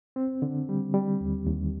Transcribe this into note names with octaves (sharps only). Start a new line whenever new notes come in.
C4
D3
G3
G3
D#2
D#2